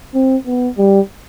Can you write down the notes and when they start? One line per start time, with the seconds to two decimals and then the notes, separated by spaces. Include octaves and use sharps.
0.15 C4
0.46 B3
0.78 G3